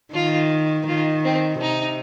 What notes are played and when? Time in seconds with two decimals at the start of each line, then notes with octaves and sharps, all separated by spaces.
0.14 D#3 F4
0.88 D#3 F4
1.25 C4
1.61 C3 D#4